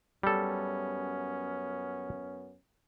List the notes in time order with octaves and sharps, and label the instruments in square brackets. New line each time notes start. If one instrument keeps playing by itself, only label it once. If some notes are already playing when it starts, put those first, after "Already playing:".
[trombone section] F#2 B3 C#4 [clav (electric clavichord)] G3 A4